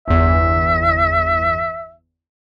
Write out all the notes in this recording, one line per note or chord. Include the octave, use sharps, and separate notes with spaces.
G1 E2 E5